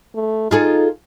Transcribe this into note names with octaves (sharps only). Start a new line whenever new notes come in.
A3
D#4 F4 G#4 A4